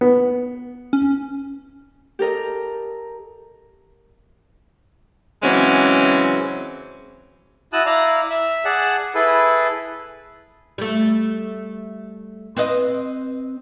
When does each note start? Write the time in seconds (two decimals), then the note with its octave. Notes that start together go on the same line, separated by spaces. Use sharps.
0.01 B3
0.93 C#4
2.19 G4 A4 A#4 D#5
5.43 C#3 E3 F#3 G#3 C4 C#4
7.73 E4 F#4 A5 D#6 F#6
7.86 E4 D5 F5 A#5
8.30 E5
8.65 G#4 D5 F#5 A5
9.15 E4 G#4 A4 B4
10.78 G3 A3
12.56 C4 B4 D#5